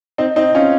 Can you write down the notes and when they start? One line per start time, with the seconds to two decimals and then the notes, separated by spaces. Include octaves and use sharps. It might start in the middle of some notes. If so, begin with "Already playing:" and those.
0.18 C4 D#4
0.36 C4 D#4
0.55 C#4 F4